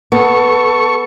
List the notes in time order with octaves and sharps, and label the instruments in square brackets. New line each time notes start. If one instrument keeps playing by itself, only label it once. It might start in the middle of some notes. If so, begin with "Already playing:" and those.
[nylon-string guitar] B3 [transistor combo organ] A4 C#6